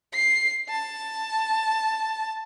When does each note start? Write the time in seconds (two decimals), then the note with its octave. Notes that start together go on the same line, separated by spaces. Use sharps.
0.13 C7
0.69 A5